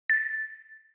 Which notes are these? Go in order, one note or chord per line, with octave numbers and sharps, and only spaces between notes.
A6